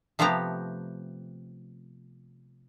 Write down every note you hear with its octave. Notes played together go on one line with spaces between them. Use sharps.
C3 F3 A3 B3 G4 A#5